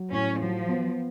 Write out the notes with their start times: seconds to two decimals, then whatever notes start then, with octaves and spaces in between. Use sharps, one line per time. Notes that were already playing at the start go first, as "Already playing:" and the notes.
Already playing: F#3
0.12 A2 C#4
0.40 F3 F#3
0.68 B3